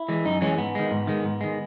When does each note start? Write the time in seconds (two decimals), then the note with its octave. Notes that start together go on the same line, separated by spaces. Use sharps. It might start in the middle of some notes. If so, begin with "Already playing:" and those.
Already playing: E4
0.09 E3 G#3
0.25 F#2 D#4
0.41 E3 G#3 C#4
0.58 G#2 B3
0.75 D#3 G#3
0.91 G#2
1.07 D#3 G#3
1.24 G#2
1.41 D#3 G#3